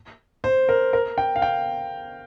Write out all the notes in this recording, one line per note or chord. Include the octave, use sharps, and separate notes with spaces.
C5
A#4
A#4
G5
F5
G5